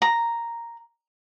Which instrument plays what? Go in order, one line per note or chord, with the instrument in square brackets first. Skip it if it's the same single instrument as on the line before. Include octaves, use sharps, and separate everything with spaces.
[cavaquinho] A#5